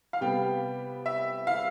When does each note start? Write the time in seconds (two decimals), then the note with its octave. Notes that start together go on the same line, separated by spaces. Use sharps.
0.13 F5
0.21 C3 G3 B3 G5
1.06 E5
1.47 F5